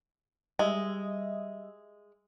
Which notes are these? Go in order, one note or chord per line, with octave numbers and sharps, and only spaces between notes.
G3 G#3 D#5 E5